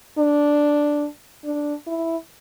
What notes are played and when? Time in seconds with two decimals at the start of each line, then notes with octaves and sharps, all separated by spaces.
0.18 D4
1.44 D4
1.87 E4